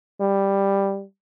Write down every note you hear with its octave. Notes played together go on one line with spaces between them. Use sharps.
G3